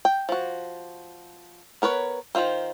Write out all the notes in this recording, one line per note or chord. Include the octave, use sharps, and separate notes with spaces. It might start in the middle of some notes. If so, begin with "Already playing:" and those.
G5
F3 F#4
B3 A#4 B4 C#5
D#3 F#3 F4 C5